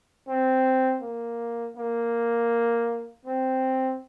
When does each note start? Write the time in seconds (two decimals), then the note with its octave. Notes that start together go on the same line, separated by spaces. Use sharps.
0.28 C4
1.02 A#3
1.76 A#3
3.25 C4